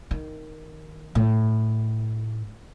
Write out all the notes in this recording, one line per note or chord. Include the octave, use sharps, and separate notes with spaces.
D#3
A2